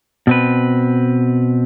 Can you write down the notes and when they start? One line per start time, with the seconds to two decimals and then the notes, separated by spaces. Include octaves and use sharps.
0.27 B2 C4 B4